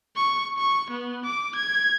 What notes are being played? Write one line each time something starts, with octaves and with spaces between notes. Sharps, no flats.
C#6
C#6
B3
D6
G#6